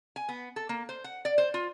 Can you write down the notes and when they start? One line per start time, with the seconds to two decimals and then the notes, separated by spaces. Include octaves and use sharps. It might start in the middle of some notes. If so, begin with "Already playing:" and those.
0.16 G#5
0.29 B3
0.56 A4
0.69 A#3
0.89 C5
1.04 F#5
1.25 D5
1.38 C5
1.54 F4